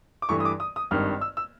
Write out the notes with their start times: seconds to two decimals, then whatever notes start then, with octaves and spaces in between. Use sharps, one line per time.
0.22 D6
0.29 G2 E3 A3 C#6
0.40 D#6
0.45 D6
0.60 D#6
0.76 D#6
0.91 G#1 G2 D#3 F6
1.21 E6
1.37 E6